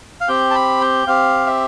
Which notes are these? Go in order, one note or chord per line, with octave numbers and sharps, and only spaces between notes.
F5
C4 G4 G5
A5
B5
G5
C4 G4 F5
E5